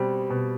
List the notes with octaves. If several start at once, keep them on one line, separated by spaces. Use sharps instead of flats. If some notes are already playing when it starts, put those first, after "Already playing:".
Already playing: B2 G3 C4
B2